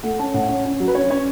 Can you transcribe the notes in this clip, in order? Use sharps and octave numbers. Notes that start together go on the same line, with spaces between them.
A3 F#5
C#4 A5
A2 F#5
C#4
C#4
F#3
B4
C#4 C#5
C#4 C#5